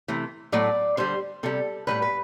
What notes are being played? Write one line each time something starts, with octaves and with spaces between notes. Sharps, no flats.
C3 E3 A3
A2 F#3 A3 D5
D3 G3 C5
C3 G3 A4
A2 E3 G3 B4
B4